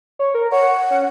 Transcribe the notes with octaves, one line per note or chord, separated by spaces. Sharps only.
C#5
A#4
C#5 F#5
C#4